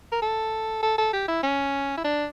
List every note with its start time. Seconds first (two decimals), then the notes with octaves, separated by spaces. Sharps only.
0.12 A#4
0.22 A4
0.83 A4
0.98 A4
1.13 G4
1.28 E4
1.43 C#4
1.98 E4
2.04 D4